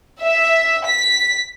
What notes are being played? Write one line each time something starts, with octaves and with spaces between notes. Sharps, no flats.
E5
B6